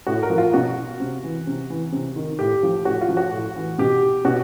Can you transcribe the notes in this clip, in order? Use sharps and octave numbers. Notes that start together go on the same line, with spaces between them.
A2 F#4
A#4
F3
F4
B2 F#4
C3
E3
C3
E3
C3
D#3
A2 G4
F3
A2 F#4
F4
F3
F#4
A2
E3
B2 G4
B2 F#4